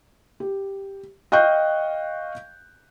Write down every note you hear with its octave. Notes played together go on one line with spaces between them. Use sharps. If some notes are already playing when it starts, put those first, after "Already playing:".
G4
D#5 F5 G5 C#6 F#6 G6